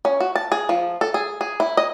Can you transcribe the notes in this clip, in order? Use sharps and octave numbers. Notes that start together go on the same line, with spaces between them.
C#4
F#4
A5
G#4
F3
A4
G#4
G#4
E4
D#5